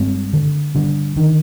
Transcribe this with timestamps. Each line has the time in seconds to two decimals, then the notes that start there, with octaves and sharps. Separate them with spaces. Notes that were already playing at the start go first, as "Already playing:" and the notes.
Already playing: G2 G#3 C4
0.33 D3
0.75 G2 D3
1.16 D3 D#3